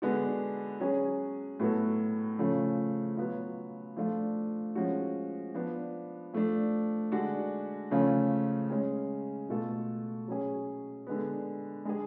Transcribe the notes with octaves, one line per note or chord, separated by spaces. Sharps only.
D3 G#3 B3 D4 F#4
F#3 C#4 G#4
A2 F#3 B3 F#4 A4
C#3 F3 A3 C#4 F4
F#3 B3 F4
F3 A3 D4 F4
F3 G#3 C#4 F#4
F3 B3 D4
F3 A3 D4
D3 G#3 D4 F#4
C#3 F3 A3 C#4 F4
G#3 C#4 G#4
B2 A3 F4 A4
F#3 C#4 G#4
D3 G#3 B3
G#3 D4 G#4